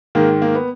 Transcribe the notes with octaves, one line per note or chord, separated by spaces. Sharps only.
G#2 D#3 A#3
A#3
B3